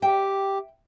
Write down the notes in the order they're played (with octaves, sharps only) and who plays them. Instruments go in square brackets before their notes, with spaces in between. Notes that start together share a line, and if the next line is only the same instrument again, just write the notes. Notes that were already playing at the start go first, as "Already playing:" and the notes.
[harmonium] G4 [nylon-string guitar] E5 G5